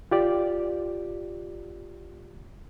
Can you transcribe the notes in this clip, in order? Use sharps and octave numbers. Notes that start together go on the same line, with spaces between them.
F4 G4 D5